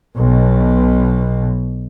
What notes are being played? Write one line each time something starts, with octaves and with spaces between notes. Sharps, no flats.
B1 B2